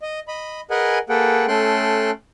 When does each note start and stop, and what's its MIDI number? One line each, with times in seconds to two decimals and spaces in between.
0.02 0.20 75
0.28 0.61 75
0.28 0.61 83
0.71 0.98 68
0.71 0.98 70
0.71 0.98 71
0.71 0.98 75
0.71 0.98 78
0.71 0.98 80
1.09 1.46 58
1.09 1.46 68
1.09 1.46 69
1.09 1.46 71
1.09 1.46 78
1.09 1.46 79
1.48 2.11 57
1.48 2.11 61
1.48 2.11 69
1.48 2.11 79
1.48 2.11 84
1.48 2.11 90